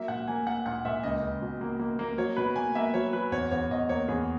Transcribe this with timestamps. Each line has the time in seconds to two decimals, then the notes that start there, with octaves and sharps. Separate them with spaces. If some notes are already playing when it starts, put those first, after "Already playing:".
Already playing: F#3 A#3 E5
0.08 A#2 F#5
0.28 A#3 G#5
0.46 A#3 F#5
0.66 A#2 F#5
0.85 A#2 E5
1.03 C#2 D#5
1.22 C#2
1.42 B2
1.61 A#3
1.79 A#3
1.99 A#3
2.18 F#3 C#5
2.37 B2 B4
2.56 A#3 G#5
2.75 A#3 E5
2.94 F#3 C#5
3.13 F#3 B4
3.32 E2 C#5
3.51 E2 C#5
3.71 E2 D#5
3.89 A#3 C#5
4.08 E2 G#4